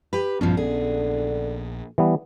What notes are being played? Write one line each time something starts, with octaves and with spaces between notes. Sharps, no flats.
G4 B4
A#1 G2 B2 F3 B3 C#4
D3 G#4
E3 G3 B3